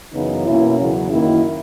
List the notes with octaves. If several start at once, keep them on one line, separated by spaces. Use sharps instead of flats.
F#2 C#3 E3 B3 D#4
B2 A#3 C#4 E4
E2 C#3 F#3
F#2 D#3 A#3 E4